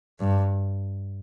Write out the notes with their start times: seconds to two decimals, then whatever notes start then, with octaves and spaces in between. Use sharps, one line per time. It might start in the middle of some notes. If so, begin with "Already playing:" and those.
0.20 G2